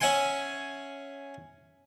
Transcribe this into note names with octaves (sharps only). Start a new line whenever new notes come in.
C#4 E5 F#5 G#5 C6